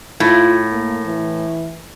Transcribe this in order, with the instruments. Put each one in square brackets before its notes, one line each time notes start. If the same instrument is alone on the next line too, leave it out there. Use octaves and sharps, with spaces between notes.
[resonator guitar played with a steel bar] A2 [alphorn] F4
[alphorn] A#3
E3